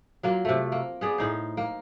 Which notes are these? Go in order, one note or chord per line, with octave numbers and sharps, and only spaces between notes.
F#3 A#3 F4
C3 A3
A#3
B3 G#4 D5
A2 D#4 C5
A#3